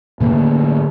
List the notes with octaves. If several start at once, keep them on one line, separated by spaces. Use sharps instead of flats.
A2 D3 A#3